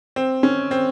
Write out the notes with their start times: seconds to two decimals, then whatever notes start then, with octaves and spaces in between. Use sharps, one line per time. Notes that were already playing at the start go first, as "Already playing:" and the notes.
0.16 C4
0.43 C#4
0.71 C4